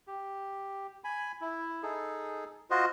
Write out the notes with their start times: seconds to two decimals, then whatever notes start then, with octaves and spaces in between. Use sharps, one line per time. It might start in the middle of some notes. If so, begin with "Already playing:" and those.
0.07 G4
1.04 G#5 B5
1.41 E4
1.83 D#4 G#4 A4
2.70 F4 F#4 C5 D#5